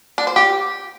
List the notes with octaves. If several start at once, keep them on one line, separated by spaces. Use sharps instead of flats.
D4
C5
G4